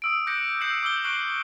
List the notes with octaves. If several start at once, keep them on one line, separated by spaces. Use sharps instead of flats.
D#6 E6 D7
D6 F#6 G6 A#6 C#7
E6 G6 C7 C#7 E7 F#7
D6 E6 F6 G7
C#6 F6 F#6 C7 D7